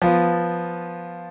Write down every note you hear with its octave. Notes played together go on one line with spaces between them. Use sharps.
F3 B3 F4